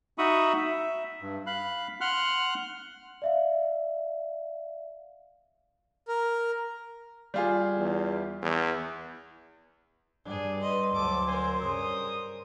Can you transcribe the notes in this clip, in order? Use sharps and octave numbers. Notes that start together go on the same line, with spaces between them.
D#4 F#4 E5 B5 C#6 D#6
E5
G2
F5 B5 F#6
F#5 C6 F6 F#6
D5 E5 F5
A#4
G3 F4 G#4
E2
E2
G2 G3 D4 G#4
B4 D#5 C6
D2 F#3 A4 D6
A#4 C5 G#5
G2 C#3 D#6